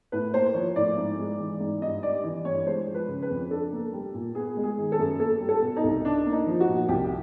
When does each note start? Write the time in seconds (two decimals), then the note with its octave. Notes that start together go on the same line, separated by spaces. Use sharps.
0.12 A2 B4
0.34 A#3 C5
0.54 F3 C#5
0.76 A2 D5
0.97 G#2
1.19 G#3
1.40 E3
1.60 G#2
1.82 G2 D#5
2.03 G3 D5
2.24 E3 D5
2.45 G2 C#5
2.66 G#3 C5
2.87 F3
2.95 B4
3.08 C#3
3.22 B4
3.30 F2
3.50 D4 A4
3.73 A#3
3.93 G3
4.14 A#2
4.35 B3 G#4
4.57 G#3
4.64 G#4
4.78 D#3
4.92 A4
4.99 F#2
5.20 A#3 A4
5.40 G3
5.49 A4
5.62 B2
5.77 D#4
5.84 C2
6.05 D4
6.26 A#3
6.32 D#4
6.47 F3
6.60 F#4
6.68 A#2
6.88 C2 G4